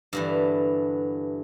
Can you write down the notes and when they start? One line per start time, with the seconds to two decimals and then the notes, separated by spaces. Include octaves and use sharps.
0.13 G2 D3 E3